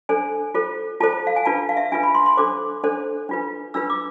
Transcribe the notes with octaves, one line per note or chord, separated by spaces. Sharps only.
D4 A4 C5 G#5
F4 A4 C5
F4 A4 C5 A5
F5
G#5
D4 F4 B4 A5
F5
E5
D4 F4 B4 G#5
B5
C6
C6
D4 A4 C5 D6
D4 A4 C5
D4 F4 B4
D4 F4 B4 E6
D6